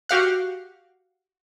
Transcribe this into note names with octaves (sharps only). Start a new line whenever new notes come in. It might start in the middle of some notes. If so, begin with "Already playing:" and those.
F#4 G4 F5 F#5